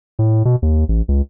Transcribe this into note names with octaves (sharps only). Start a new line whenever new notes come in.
A2
B2
D#2
A1
C#2